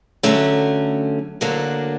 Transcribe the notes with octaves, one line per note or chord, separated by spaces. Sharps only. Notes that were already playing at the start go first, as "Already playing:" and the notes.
D3 F#3 A3 C#4
D2 D3 F#3 A#3 D4